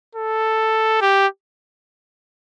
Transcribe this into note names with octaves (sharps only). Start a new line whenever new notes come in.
A4
G4